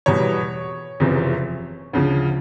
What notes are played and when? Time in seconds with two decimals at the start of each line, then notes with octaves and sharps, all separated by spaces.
0.06 E2 B2 G3 C#5
1.00 F#1 E2 C3 F3
1.93 D2 C#3 F3